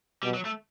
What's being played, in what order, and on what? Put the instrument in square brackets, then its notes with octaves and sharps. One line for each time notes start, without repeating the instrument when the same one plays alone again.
[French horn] B2 [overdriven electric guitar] G3
[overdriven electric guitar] F#3
A3